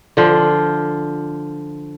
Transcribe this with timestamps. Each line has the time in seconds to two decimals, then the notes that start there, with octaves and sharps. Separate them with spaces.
0.17 D3 F3